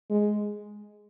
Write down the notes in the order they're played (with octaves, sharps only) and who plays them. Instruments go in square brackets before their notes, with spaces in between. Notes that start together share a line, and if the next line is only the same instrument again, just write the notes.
[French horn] G#3